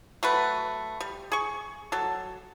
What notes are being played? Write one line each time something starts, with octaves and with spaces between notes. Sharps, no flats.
F#3 A3 B4
G3
G#4 C#6
F#3 A4